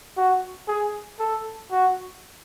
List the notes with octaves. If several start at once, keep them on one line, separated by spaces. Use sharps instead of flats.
F#4
G#4
A4
F#4